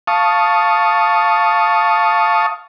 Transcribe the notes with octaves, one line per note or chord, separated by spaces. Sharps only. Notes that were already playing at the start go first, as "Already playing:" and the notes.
F5 A5 C#6 D#6